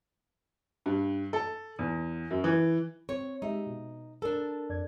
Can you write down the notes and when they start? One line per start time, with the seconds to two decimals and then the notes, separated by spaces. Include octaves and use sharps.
0.86 G2
1.33 A4
1.79 E2
2.30 F#2
2.44 E3
3.09 C4 C#5
3.42 G#3 D#4 G4 E5
3.66 B2
4.22 D4 A4 A#4
4.69 F2 D5 G#6